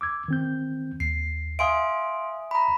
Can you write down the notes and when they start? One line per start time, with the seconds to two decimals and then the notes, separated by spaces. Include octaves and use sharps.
0.01 D6 E6 G#6
0.28 D#3 C4 G6
1.00 D#2 C7
1.59 E5 F5 G#5 C6 D#6 D7
2.51 A#5 B5